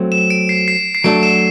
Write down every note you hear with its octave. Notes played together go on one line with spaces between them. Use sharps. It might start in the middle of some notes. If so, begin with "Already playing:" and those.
Already playing: F#3 A3 C4
E7
D7
C7
C7
C7
F#3 A3 D4 F#4 D7
E7